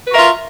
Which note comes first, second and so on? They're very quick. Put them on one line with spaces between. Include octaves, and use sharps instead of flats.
B4 F#4 A#4 E5 F4